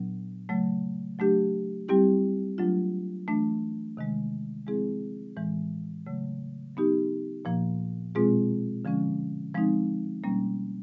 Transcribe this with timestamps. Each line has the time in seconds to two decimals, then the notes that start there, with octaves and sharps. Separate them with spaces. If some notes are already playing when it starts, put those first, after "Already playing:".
Already playing: A#2 F#3 B3 D4
0.49 C#3 F#3 A3
1.19 F#3 A3 D4 G4
1.88 G3 C4 E4 G4
2.58 F#3 A3 D4 F4
3.28 E3 A3 D4
3.97 C3 D#3 G#3
4.67 F3 G#3 C4 E4 G#4
5.36 A2 E3 G#3
6.06 C#3 F#3 A3
6.75 F#3 B3 D#4 G4
7.45 A#2 F3 A#3
8.15 B2 G#3 C4 F4 G#4
8.85 D3 F3 G#3 C#4
9.54 F3 G#3 C4 D#4
10.24 B2 G3 A#3 C#4